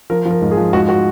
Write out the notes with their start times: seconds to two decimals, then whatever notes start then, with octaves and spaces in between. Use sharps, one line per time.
0.10 F3 A#4
0.25 F3
0.31 A#4
0.41 G#2
0.51 G#4
0.57 F3
0.73 G#2 F#4
0.89 F#4